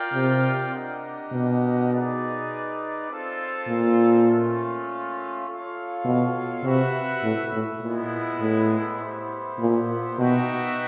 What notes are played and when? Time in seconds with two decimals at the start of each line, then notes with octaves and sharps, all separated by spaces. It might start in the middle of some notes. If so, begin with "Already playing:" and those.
Already playing: F4 A#4 D5 G5
0.14 C3
0.73 D4 G4 A#4 D#5 F#5
1.32 B2
1.91 D#4 G#4 B4 D5
3.09 C4 F4 A4
3.69 A#2
4.28 A3 C#4 F4
5.46 F4 A4 C#5 F5
6.05 B2
6.64 C3 F#4 B4 E5
7.23 A2
7.52 A2
7.82 A#2 G#3 B3 E4
8.41 A2
9.00 B3 E4 G4 C5
9.60 A#2
10.18 B2 D#4 F#4 B4 E5 G5